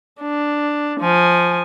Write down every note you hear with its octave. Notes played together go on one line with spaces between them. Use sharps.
D4
F3 G#5